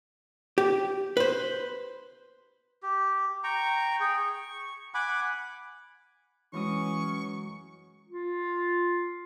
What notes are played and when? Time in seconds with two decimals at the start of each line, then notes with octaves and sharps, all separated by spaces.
0.58 G4
1.17 B4 C5
2.83 G4
3.44 G5 A#5 C#6
4.00 G#4 G5
4.18 C#6
4.94 F#5 G#5 B5 D6
6.53 F#2 E3 G#3 C#4 C#6 D#6
8.09 F4